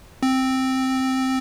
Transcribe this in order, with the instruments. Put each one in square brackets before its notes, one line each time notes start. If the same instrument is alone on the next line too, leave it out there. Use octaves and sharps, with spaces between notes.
[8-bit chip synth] C4